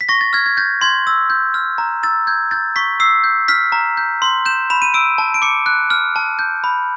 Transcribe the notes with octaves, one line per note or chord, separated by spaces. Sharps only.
B6
C#6 A#6
A6
F6 G#6
G#6
G6 A6
C6 G#6
E6
G6
F6
A#5
E6 A6
G6 G#6
G6 A6
C#6 B6
E6 C7
G6
F6 B6
A#5
G6
C6
G6 E7
B5 E7
D#7
E6 D7
A5
D7
D6 C#7
F#6
F6
A5
G6
B5